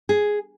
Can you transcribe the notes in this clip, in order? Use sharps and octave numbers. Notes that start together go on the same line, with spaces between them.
G#4